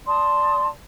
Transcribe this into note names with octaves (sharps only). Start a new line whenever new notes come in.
D5 A5 C6 D#6